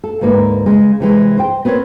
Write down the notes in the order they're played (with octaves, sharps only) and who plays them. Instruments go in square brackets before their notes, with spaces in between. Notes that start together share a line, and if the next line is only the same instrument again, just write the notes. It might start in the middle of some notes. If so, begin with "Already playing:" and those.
[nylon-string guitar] A4
D2 G#2 A#3 B4
C#3 G#3
C3 E3 G#3
C5 G5
B3 C4 A#4 C#5